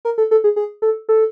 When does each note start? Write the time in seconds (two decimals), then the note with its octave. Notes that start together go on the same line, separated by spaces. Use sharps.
0.05 A#4
0.18 A4
0.31 A4
0.44 G#4
0.56 G#4
0.82 A4
1.09 A4